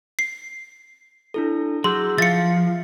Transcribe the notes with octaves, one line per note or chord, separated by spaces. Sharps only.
C7
D4 E4 A4
F#3 G#4 C6 E6 G6
F3 E5 F5 A6 C#7